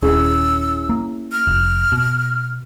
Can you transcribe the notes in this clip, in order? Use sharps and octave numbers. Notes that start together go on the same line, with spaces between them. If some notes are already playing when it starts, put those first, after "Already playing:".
D#1 C#4 E4 G#4 E6
A#3
F6
F1
B2